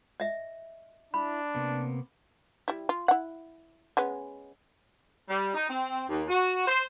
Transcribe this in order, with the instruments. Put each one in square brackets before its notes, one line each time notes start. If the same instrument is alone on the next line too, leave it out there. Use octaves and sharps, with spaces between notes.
[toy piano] D#5 E5
[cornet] D4 [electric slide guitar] E4 [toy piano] B5
[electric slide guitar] C3 A#3 B3
[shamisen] G3 E4
F4
E4 F#5
G#3 B3 C#4
[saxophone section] G3
D#4
C4
D#2
F#4
C5